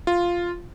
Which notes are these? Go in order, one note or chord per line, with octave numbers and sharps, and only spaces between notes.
F4